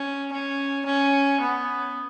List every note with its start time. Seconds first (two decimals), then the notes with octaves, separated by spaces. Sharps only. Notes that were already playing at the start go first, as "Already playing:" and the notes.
Already playing: C#4
0.32 C#4
0.86 C#4
1.41 B3